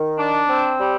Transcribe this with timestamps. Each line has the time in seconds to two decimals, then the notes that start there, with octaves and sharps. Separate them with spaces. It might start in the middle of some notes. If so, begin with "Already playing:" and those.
Already playing: D#3
0.18 D4
0.49 C4
0.80 G3